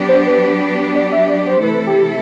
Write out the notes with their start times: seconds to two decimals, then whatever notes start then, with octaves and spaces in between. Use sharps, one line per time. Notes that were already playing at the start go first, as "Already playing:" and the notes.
Already playing: F#3 B3 D4 G4
0.09 C5
0.27 B4
0.95 D5
1.12 E5
1.29 D5
1.39 D5
1.47 C5
1.63 C3 E3 A3 E4 A4 B4
1.87 G4